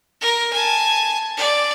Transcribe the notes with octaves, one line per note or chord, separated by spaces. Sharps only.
A#4
G#5 A5
D5